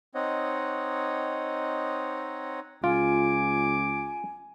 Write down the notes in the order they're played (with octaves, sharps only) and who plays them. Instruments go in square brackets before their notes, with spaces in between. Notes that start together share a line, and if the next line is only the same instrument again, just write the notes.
[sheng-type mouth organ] C4 D#4 C#5 D#5 F#5
[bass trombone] C#2 [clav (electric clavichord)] F4 [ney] G#5 [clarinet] D6